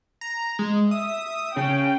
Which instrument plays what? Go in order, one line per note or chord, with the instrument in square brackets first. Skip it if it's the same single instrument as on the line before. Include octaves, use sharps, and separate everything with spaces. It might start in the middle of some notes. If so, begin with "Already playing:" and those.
[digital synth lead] A#5
G#3
[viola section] E5 [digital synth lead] D#6
[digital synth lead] C#3 [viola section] C#4 G5